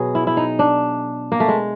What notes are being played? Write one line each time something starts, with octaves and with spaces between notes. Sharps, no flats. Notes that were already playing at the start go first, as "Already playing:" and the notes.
Already playing: B2 F#3 G#4
E4
E4
D#4
D4
A#3
A3
G#3